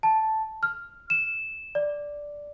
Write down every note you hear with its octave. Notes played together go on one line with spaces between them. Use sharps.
A5
F6
E7
D5